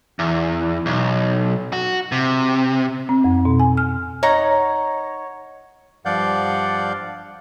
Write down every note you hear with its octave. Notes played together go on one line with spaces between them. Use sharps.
E2
B1
F#4
C3
C4
F2
B2
G#5
F6
D#4 C#5 F#5 A#5
G2 F3 D5 F5 F#5 G6